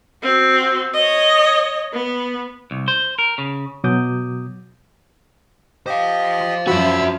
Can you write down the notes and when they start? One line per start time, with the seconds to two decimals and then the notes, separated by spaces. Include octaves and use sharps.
0.22 C4 F#4
0.94 C#5 D#5
1.93 B3
2.71 C2
2.88 C5
3.19 A#4
3.38 C#3
3.84 B2 F#3 D6 D#6 G6
5.86 G4 C5 D#5 F5
6.67 F#2 F3 F#4 E5 B5 E6